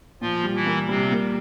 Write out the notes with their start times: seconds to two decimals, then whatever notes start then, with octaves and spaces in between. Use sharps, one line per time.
0.21 A#2 F3 F4
0.44 G3
0.55 E3 E4
0.66 A#3
0.89 C3 G3 C4
1.12 A#3